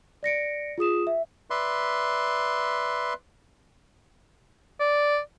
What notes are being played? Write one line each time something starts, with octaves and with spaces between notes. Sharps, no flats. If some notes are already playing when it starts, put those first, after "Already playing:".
D5 A#6 C#7 D7
F4 G#4 D#6 E7
E5
B4 D5 E5 C6
D5